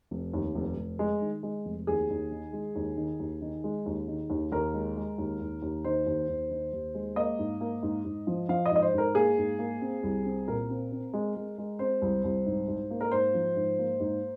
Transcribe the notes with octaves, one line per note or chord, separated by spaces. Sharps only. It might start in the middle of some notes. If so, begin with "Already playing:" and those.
F1
D#2
F1
F1
G#3
D#3
G#3
F1
D#2 G#4
D#2
D#3
G#3
D#2
D#3
D#2
D#3
G#3
D#2
D#3
D#2
D#2 A#4
G#3
G#3
D#2
D#2
D#2
D#3 C5
D#2
D#2
D#3
D#2
G#3
A#3 D#5
G#2
A#3
G#2
G#2
F3
F3 F5
D#5
G#2
D#5
C5
G#2 A#4
A#3 G#4
G#2
A#3
C4
C2
C4
A#2 A#4
C4
C4
G#3
G#3
G#3
C4 C5
C2
C2
G#2
G#2
A#3
A#4
G#2 C5
F3
G#2
A#3
G#2